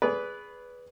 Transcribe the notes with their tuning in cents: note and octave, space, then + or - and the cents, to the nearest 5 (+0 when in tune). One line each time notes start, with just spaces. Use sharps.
G#4 +0 B4 +0 D5 -30